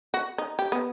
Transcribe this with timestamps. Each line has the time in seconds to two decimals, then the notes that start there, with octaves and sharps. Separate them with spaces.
0.14 F#4
0.38 D#4
0.59 G4
0.72 B3